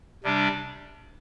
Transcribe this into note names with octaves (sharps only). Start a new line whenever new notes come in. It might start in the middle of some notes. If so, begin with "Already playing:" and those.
C3 G3 D4